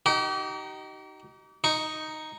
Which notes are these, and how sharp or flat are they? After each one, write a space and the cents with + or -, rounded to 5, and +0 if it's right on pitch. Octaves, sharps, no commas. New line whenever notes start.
D#4 +0 G4 -40
D#4 +0 C#6 +0